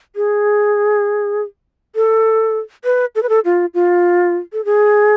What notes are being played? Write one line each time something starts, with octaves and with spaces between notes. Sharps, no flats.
G#4
A4
B4
A4
B4
A4
F4
F4
A4
G#4